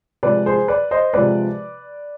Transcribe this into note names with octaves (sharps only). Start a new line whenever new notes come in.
C3 F3 G#3 C4 B4 D5
G#4 C5
B4 D5
C5 D#5
C3 F3 G#3 C4 B4 D5